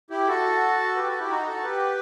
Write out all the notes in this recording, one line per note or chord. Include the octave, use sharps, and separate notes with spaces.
E4 G4
F#4 A4
G4 B4
F#4 A4
E4 G4
D#4 F#4
F#4 A4
G4 B4